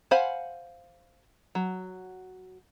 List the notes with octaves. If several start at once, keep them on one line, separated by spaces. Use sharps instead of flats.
C5 F5 F#5 G#5 B5
F#3